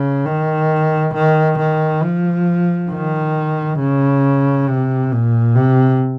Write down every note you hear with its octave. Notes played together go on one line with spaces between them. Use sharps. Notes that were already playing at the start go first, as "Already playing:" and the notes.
Already playing: C#3
D#3
D#3
D#3
F3
D#3
C#3
C3
A#2
C3